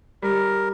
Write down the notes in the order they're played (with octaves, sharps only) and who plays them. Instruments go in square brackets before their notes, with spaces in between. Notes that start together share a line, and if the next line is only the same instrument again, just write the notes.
[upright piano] G3 [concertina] A#4